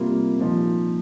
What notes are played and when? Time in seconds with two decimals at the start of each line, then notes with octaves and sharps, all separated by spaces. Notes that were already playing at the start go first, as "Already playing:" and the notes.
Already playing: C3 G3 A#3 F4
0.39 A#2 F3 D#4